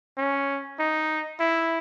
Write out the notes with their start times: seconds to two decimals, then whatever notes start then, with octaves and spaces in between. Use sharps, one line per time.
0.17 C#4
0.79 D#4
1.40 E4